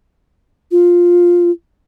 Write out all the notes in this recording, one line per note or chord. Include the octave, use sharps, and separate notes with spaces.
F4